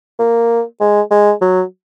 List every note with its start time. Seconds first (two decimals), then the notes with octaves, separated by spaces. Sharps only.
0.19 A#3
0.80 G#3
1.11 G#3
1.41 F#3